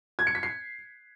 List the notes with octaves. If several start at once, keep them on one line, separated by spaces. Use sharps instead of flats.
G#6
C#7
B6
C7